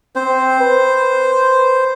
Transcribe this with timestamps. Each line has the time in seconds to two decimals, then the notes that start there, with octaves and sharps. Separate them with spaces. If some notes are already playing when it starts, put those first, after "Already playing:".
0.16 C4 C5
0.60 B4